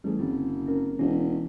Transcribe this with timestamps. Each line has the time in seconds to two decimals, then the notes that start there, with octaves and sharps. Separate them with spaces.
0.04 A1 G3 G#4
0.19 F#1 D3 C4
0.66 C4 C#4 A#4
0.99 E1 E3 C#4 D#4